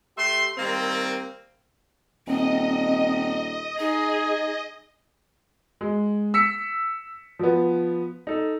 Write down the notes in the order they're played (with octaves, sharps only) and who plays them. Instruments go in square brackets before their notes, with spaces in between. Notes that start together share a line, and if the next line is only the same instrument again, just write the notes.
[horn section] A3 G4 E5 C6
D#3 G3 A#3 C4
[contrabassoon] D#1 [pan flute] C4 [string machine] D#5
[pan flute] D#4 [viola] G#4
[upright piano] G#3
E6 B6 C#7
F3 B3
D#4 A4